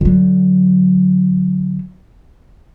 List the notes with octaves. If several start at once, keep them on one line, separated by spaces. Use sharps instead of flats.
D3 F#3